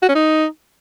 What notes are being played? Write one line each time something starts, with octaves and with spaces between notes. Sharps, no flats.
F#4
C#4
D#4